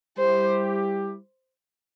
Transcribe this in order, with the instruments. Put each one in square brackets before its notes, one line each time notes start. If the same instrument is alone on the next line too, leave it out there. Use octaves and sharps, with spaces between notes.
[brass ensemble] G3 E4 G4 [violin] C5